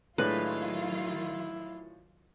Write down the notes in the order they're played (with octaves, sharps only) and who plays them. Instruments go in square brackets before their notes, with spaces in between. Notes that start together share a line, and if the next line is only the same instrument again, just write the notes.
[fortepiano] A2 G#3 D4 [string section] D#3 F#3 F4 [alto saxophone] E4 [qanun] B4